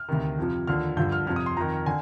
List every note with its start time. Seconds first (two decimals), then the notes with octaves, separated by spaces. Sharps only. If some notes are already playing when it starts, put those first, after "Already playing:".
Already playing: F6
0.09 D2 C3 D#3
0.38 F2 C3 F3
0.67 D#2 D3 F3 F6
0.97 G2 D3 F3 G6
1.12 F6
1.27 F2 C3 F3 F6
1.36 D#6
1.46 C6
1.57 F2 D#3 A#5
1.86 D3 G#5